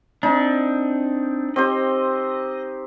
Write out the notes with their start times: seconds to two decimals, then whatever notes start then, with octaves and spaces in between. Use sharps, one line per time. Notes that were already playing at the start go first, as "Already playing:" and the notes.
0.23 C4 D4 D#4
1.56 C4 G4 C5 D#5